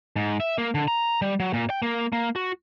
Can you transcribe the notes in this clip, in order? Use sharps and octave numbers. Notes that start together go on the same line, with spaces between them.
G#2
E5
A#3
D3
A#5
G3
F#3
A#2
G5
A#3
A#3
F#4